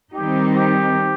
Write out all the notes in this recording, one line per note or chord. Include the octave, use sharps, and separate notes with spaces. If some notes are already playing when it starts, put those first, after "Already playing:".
D#3 G3 C4 D#4 G4
G4